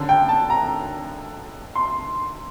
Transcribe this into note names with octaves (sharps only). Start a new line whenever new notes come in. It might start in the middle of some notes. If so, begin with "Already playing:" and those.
Already playing: F#2 D3
G5
A5
A#5
C6